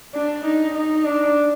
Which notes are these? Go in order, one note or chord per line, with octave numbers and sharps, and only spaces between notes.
D4
D#4
D#4
D4